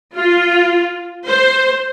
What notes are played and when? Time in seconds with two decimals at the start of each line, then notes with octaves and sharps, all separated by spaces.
0.15 F4
1.26 C5